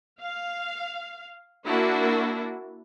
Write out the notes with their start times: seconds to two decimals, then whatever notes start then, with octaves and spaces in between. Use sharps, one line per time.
0.20 F5
1.64 A#3 D4 E4 F#4